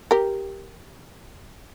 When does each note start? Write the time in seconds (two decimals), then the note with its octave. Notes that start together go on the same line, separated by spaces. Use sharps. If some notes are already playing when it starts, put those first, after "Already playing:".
0.11 G4 A#4